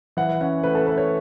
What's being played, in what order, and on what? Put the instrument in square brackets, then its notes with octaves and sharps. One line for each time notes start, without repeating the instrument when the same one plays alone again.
[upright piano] E3 F#5
C#4 F#5
A3 B4
A4
A3 B4
C#5